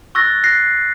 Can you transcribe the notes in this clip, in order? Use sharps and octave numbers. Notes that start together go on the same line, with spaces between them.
C#6 E6 F#6 A6 A#6
F#6 A#6 C7